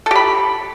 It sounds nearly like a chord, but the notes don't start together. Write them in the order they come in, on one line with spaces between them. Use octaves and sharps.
A4 G4 B5